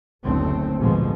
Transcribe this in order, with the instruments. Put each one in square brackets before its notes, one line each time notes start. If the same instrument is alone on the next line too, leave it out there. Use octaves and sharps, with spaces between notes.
[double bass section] F#1 D2 B2 A3 C4
A1 D2 G#2 B2 F3 G#3